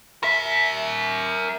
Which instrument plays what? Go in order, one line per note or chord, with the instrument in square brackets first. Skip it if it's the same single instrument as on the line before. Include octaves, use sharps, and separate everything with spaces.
[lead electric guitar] A#4 E5